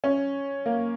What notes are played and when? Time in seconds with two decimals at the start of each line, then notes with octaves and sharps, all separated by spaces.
0.04 C#4
0.66 A#3